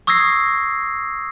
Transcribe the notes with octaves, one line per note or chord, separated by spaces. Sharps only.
C#6 D#6 E6 G#6 A#6 C7